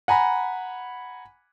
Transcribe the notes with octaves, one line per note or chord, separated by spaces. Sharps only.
F#5 G#5 A#5 B5